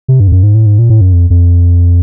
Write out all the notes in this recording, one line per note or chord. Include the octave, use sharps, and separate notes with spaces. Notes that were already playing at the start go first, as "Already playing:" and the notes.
C3
G2
F2
F#2
G#2
A2
G#2
A#2
A2
F#2
F2
F2